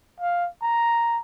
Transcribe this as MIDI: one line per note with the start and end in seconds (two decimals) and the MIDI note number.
0.20 0.48 77
0.62 1.20 82